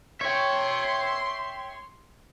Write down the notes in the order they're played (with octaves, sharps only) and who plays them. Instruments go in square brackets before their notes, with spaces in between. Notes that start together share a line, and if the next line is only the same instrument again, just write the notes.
[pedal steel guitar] C#5 [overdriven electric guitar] E5 G5 [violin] C6